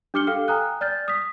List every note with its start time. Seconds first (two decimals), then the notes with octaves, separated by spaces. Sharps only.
0.14 D4 G4 D6 F6 C#7 G7
0.27 A4 F5 G5 F6
0.48 G5 G#5 A#5 D#6 F#6
0.81 D5 F6 G6 A6
1.08 D#6 B6